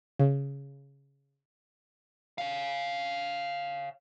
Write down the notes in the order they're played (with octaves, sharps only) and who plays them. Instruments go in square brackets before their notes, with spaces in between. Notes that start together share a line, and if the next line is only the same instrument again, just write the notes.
[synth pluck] C#3
[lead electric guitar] C#5 F5